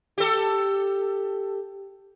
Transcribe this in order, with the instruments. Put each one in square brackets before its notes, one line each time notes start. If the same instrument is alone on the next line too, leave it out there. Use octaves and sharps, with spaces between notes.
[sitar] G4 A4